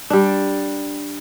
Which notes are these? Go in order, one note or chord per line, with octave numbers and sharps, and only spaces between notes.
G3 D4